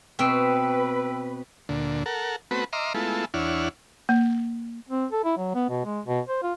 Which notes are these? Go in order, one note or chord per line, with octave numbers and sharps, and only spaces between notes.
B2 C4 B4 G5 E6 D7
D2 A#2 D3
A4 A#4 F#5
A3 B3 C4 F#4 B4
D#5 E5 A#5 C6 D6 F6
G#3 A3 B3 E4 F4 A4
E2 D4 E4 C#5 F#5 F6
A#3
C4
A4
E4
F#3
B3
B2
G#3
B2
C5
F4